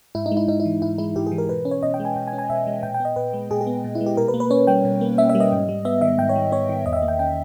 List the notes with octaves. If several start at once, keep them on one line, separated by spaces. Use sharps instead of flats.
G#2 E4
D#4
G#3
E4
G#2 D#4
E4
E3
G#2 E4
G#3 E4
G#2 G4
G#4
E3
A#4
B2 B4
C#4
C#5
B2 D#5
G5
G#3
G#5
B2 G5
G#5
C#4
G#5
B2 E5
G#3
A#2 G5
G5
B3 D#5
A#2 B4
G#3
A#2 G#4
G#4
B3
A#2
E4
G#3
G4
B2 A#4
B4
A#3
B4
C#4 C#5
G3 G5
B2
A#3
C#4 E5
E5
G3
D#5
G#2
G3
B3 E5
D#3 E5
G#2 G5
C#5
G3
B3 C#5
D#3
E2 D#5
E5
D#5
A#3
G5
C#4 G5